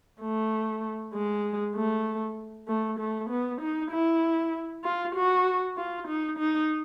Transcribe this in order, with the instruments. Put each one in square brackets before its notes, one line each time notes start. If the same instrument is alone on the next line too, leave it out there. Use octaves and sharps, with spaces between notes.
[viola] A3
G#3
A3
A3
A3
B3
D#4
E4
F4
F#4
F4
D#4
D#4